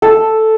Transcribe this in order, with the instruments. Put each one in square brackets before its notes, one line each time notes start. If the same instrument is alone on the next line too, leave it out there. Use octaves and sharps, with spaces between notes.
[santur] A4